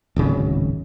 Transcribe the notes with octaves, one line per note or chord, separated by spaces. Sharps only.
D1 G#1 C#3 C4